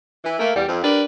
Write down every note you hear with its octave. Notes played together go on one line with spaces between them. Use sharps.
E3
A3 A#3
E2 G3
F2
D4 G4 A#4 B4